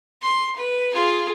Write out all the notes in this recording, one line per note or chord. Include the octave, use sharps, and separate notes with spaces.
C6
B4
F4 G#4